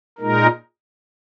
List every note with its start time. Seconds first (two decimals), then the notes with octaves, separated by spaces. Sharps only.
0.19 A#2 G#3 D#4 A#4